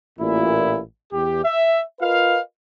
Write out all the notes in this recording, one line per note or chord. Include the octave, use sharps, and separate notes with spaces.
A1 A#2 E4
E2 G4
E5
F4 A#4 B4 D#5 F5